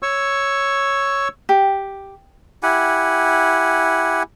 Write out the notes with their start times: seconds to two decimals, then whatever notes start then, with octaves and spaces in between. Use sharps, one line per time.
0.03 C#5 C#6 E6
1.49 G4
2.63 E4 G4 F#5 G#5